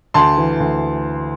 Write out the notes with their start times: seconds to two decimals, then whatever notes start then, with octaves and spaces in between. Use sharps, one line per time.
0.14 D2 A5 C6
0.37 E3
0.60 D2